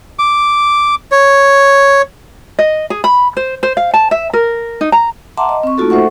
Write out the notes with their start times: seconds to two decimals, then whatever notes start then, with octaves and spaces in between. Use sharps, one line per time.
0.19 D6
1.12 C#5
2.59 D#5
2.90 G#4
3.04 B5
3.37 C5
3.63 C5
3.77 F5
3.94 A5
4.11 E5
4.33 A#4
4.81 D#4
4.92 A#5
5.37 E5 F#5 A5 A#5 C6 D6
5.49 D#5
5.63 C4 C#6
5.78 A3 A#3 D#4 F4 F#4 A4
5.90 A4 C5 E5 F#5 C#6